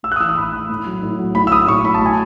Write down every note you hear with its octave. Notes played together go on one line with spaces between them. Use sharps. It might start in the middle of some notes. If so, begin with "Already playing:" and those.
A2 E6
F#6
D#6
E3 E6
D#6
A2 B5
E3 B5
A2
F#3
A2
F#3
A2 B5
E6
F#3 D#6
A2 C#6
F#3 B5
A5
A2 G#5